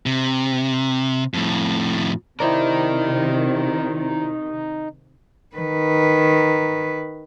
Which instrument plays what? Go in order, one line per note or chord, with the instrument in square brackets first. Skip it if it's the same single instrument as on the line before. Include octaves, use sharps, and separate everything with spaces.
[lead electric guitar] C3
F2 A2
[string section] C3 D#3 [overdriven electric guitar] D#4 A#4 [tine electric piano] E4 C5 D5
[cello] D#3 B4